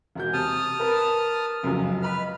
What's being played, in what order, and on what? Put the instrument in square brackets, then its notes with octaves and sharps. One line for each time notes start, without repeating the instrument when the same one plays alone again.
[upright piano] E1 F#4 G6
[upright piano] C3 [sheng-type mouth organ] A5 D#6 F6
[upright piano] A#4 B4
F1 C#2 F#2
[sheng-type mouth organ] B4 F6 [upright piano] D#5 B5